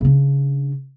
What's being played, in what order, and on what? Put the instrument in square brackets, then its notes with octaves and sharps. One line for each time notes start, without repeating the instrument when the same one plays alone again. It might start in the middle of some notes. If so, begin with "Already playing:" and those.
[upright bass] C#3 D4